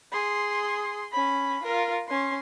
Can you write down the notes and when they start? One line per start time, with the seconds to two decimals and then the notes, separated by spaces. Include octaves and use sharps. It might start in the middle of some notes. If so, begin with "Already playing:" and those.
0.12 G#4 C6
1.12 C#4 B5
1.63 F4 A#4
2.08 C#4 C6